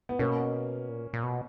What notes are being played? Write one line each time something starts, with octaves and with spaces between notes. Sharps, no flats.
B3
B2 A#3 C#4
A#2
A#2
B2